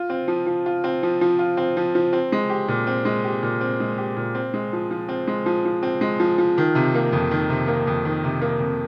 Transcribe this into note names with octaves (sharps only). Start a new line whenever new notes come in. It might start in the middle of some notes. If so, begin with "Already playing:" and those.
Already playing: F4
C4
F3
F3
F4
C4
F3
F3
F4
C4
F3
F3
C4
G#3
G4
A#2
C4
G#3
G4
A#2
C4
G#3
G4
A#2
C4
G#3
F3
F3
C4
G#3
F3
F3
C4
G#3
F3
F3
D#3
C3
A#3
F2
D#3
C3
A#3
F2
D#3
C3
A#3
F2